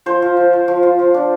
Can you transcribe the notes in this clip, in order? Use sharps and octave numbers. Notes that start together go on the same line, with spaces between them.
F3 C5
F3
F3
F3
F3
F4
F3
D4